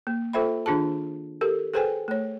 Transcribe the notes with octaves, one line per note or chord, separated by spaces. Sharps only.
A#3
F4 A4 C5 E5 G5 B5
D#3 D4 F4 G#4 A5
G4 A4 A#4
G#4 A4 B4 C5 G5 G#5
A3 C#5